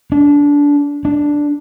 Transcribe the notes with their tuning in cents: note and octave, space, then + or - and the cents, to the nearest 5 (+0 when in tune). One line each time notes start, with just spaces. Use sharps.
D4 -20
D4 +0